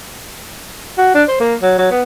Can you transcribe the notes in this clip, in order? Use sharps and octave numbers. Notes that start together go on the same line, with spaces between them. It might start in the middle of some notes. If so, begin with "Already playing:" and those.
F#4
D4
C5
A#3
F#3
F#3
B3